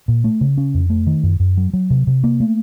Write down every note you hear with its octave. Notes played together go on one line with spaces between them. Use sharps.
A#2
A3
C#3
C#4
F2
A3
D#3
F#2
F#2
F#3
F#3
C3
C3
A#3
A3